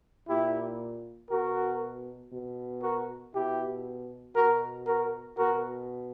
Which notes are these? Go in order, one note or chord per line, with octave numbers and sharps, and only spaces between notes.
A#2 E4 G4
B2 F#4 A#4
B2
F#4 A#4
B2 E4 G4
B2 F#4 A#4
F#4 A#4
B2 F#4 A#4